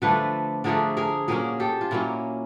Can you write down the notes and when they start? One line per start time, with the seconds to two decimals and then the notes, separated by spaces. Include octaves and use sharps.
0.02 D3 F3 A3 D4 A4 B4
0.64 D3 F3 A3 D4 G#4 A#4
0.97 G#4 A#4
1.28 A#2 F#3 A#3 C#4 G#4 A#4
1.60 G4 A4
1.81 F4
1.91 A#2 F#3 A#3 C#4 E4